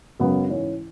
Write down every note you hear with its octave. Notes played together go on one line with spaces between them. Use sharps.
F#2 C#3 G#3 B3
G#2 E3 C#4